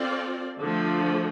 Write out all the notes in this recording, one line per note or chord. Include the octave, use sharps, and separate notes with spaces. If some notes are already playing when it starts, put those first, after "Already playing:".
Already playing: C4 F4 A4 D5
D3 F3 A3